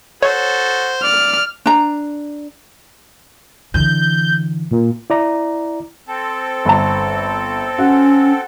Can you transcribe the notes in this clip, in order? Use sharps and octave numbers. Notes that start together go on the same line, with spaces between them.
F#4 A4 C5 C#5
D5 F6
D4 A#5
D3 E3 G6
A#2
E4 D5 A#5
C4 A4
G1 A5
C#4 F#4 F#5